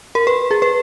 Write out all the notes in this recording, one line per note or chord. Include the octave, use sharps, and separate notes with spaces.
A#4
B4
G#4
B4